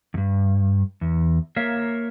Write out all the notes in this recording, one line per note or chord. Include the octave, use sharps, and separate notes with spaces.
E2 G2
E2
A#3 A#4 C#5 E5 F5